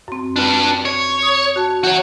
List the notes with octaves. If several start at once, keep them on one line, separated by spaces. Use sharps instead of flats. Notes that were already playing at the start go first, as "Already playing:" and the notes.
F#2 C4
D4 F4 B4
C#5
D#6
F#4 A5
E3 F#4 C#5